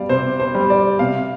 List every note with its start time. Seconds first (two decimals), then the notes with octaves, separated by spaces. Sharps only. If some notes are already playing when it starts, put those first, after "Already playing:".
Already playing: G3 D5 F5
0.09 C3 C5
0.40 C5
0.55 G3
0.70 D5
0.99 C3 F5